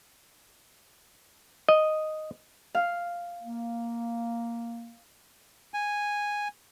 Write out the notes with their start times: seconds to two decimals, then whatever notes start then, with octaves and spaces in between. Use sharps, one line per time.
1.69 D#5
2.75 F5
3.41 A#3
5.74 G#5